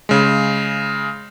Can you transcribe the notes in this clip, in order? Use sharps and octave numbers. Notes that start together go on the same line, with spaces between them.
C#3 G#3